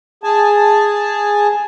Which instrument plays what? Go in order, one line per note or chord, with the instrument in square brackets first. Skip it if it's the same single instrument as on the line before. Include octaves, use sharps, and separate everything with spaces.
[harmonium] G#4 G#5 A5